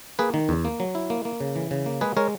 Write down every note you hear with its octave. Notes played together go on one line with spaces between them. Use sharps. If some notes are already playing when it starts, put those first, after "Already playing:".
A#3 G#4 B4
D#3
E2
A#3
F#3
E4
A#3
A#3
C#3
E3
C#3
A#3
G#3 G#4 B4
G#3 A#4 C#5